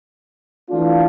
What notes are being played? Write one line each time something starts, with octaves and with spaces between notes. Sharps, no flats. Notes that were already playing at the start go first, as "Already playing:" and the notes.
E3 A3 D4 F4